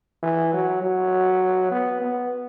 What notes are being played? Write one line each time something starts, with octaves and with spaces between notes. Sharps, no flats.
E3
F#3
F#3
B3
B3